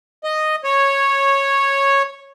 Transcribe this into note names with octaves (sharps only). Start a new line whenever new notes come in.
D#5
C#5